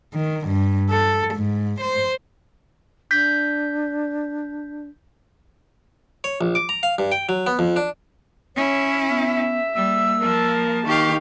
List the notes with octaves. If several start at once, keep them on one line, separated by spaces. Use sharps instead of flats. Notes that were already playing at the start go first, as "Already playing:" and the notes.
D#3
G2
A4
G#2
C5
D4 G6 B6
C#5
A#1
D6
A#5
F5
G2
G5
F#3
B3
F2
D4
C#4 E4 C#5
B3 E5
G3 A#3 E6
F3 A#4 A5
D#3 G4 F5 C#6